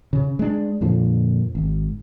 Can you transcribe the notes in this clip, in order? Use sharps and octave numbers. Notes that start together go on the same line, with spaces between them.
C#3
G#3 D4
F2 A#2 D3 F3
G#1